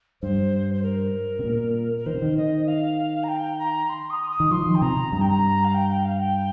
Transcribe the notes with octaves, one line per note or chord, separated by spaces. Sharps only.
G2 C5
C5
A#4
C3
A#2
A#4
D#3 C5
C3
D#3
D#5
F5
A#5
G5
A#5
C6
D#6
D#6
D#3
F3 C6
D#3
G5
C3 A#5
G2 A#5
G5
A#5
F5
G5
G5
F5
G5